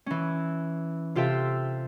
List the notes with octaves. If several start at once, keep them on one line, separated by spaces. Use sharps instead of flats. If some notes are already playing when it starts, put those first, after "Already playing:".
E3 C#4
C3 F4 G4 A4 E5